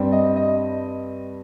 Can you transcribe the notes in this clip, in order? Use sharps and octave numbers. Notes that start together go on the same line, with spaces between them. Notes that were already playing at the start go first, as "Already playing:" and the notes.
Already playing: G2 G3 C4
D#5
D#5